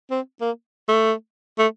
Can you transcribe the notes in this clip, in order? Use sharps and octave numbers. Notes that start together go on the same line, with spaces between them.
C4
A#3
A3
A3